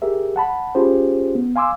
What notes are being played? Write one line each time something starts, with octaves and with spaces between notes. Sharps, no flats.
G4 G#4 A#4 E5
F#5 A5 B5
C#4 F4 G4 G#4 C5
B3
F5 G#5 C6 D6 E6